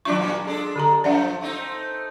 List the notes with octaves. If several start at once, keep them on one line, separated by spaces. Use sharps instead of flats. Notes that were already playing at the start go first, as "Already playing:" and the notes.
D#3 F#3 D4 E4 F4 C#6
A#2 G3 A#3
G#3 D4 A4
D3 G4 A#5
F#2 F3 D5 E5 F#5
A3 C4 D#4